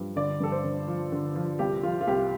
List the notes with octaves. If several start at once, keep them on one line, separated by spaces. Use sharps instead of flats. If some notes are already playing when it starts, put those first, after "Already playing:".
Already playing: G2 F3
D3 D5
G2 A4
C5
D3
F3
D3
F3
C2 G4
F3 F4
F4
C2 G4